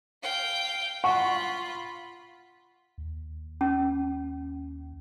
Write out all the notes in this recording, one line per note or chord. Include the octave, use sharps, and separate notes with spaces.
F5 G5
F4 F#5 B5 C#6
D#2
C#4